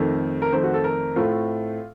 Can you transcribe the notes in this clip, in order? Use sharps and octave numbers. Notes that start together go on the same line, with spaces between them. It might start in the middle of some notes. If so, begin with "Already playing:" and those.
Already playing: F2 D#3 A3
A#4
F2 D#3 A3 C5
F#4
A4
A#4
A2 A3 C4 F4